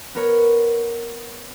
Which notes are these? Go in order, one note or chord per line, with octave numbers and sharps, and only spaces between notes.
B3 A#4 C#5